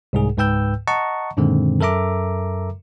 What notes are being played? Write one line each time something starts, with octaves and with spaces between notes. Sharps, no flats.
C2 G#2 G#4
C#2 G#2 B4 G5 E6 G6
D#5 F#5 A5 A#5 C#6
F#2 A#2 D3 D#3 G#3 C4
F#2 A4 A#4 E5 A#5 D6